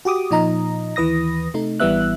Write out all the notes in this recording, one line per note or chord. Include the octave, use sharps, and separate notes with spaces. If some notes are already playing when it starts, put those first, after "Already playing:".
F#4 G4 D6 D#6
A#2 F3 D#4 D#5 A#5
D#2 E3 B4 D#6 A#6
C3 A3 D#4
G#1 E3 G3 B3 E5 F#6